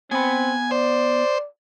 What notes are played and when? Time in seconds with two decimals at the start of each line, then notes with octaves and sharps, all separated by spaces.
0.11 B3 C4 G#5 B5
0.71 C5 D5